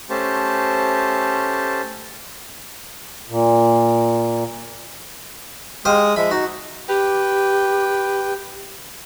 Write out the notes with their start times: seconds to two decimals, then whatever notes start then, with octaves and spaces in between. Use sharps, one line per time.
0.10 A3 C#4 G4 C5 A5
3.29 A#2
5.85 G#3 G4 C5 F5 D#6
6.16 F3 G#3 E5 B5
6.31 D#4 F#4
6.89 G4 B4 G5